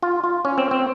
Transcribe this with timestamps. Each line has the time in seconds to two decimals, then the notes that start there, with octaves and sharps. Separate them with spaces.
0.03 F4
0.24 F4
0.45 C#4
0.58 C4
0.71 C4